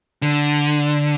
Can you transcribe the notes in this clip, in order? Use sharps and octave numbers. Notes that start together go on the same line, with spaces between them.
D3